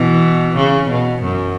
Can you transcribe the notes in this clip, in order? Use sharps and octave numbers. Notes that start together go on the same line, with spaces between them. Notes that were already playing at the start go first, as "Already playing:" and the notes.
Already playing: B2 E3
C#3
B2
F#2